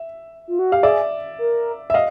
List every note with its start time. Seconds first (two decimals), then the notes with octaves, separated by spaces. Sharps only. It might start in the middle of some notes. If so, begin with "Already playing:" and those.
Already playing: E5
0.48 F4
0.59 F#4
0.72 G4 F5
0.83 G#4 D5 E5
1.39 A#4
1.90 E5
1.94 D#5 F5